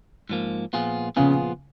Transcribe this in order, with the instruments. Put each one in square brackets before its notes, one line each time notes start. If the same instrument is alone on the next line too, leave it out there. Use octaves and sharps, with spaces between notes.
[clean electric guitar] G#2 F3 A#3
A#2 F3 B3 F4 G#4
[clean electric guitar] A#2 F3 B3 F4 G#4 [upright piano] C#3